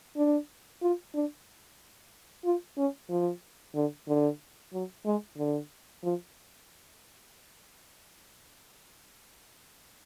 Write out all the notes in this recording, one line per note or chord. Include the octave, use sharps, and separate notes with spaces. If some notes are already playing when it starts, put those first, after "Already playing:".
D4
F4
D4
F4
C#4
F3
D3
D3
F#3
G#3
D3
F3